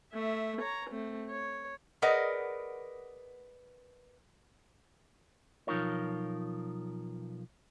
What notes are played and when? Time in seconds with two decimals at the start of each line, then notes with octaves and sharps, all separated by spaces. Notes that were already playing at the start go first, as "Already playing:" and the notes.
0.13 A3 E5
0.62 C#5 A#5
0.90 A3 C4
1.30 C#5
2.02 G#4 A#4 B4 D5 D#5 F#5
5.67 B1 F3 D#4 F4 A#4 C#5